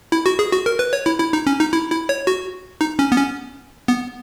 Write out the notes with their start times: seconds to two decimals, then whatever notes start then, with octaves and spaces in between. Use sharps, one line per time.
0.12 E4
0.26 F#4
0.39 G#4
0.52 F#4
0.66 A#4
0.79 B4
0.93 C#5
1.06 E4
1.20 E4
1.33 D#4
1.47 C#4
1.60 D#4
1.73 E4
1.91 E4
2.09 C#5
2.27 F#4
2.81 D#4
2.99 C#4
3.12 B3
3.17 C#4
3.88 B3